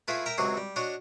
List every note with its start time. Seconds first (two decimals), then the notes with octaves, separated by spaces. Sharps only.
0.08 A3 E4 F4 G#4 B4
0.26 A#4 E5 G5 A#5
0.38 C#2 C3 F#3 F#4 G#4 C6
0.57 G3
0.76 D4 F#4 C#5 D#5